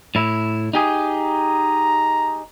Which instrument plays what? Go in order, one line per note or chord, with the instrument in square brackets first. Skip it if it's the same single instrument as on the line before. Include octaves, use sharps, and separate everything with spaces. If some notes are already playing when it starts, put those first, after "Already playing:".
[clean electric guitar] A2 E4
D#4 G4 G#4
[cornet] A#5